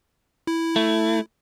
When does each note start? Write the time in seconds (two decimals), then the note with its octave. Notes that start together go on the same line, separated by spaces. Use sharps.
0.47 E4
0.76 A3